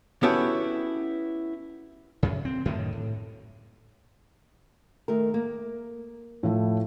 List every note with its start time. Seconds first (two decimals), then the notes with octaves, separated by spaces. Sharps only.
0.23 B3 C#4 E4 F#4 G4 A4
2.23 F#2 C#3
2.45 C4
2.65 F#2 A2 D3 D#3
2.93 A2
5.08 D#3 A3 A#4
5.34 A#3
6.43 A2 F3 E4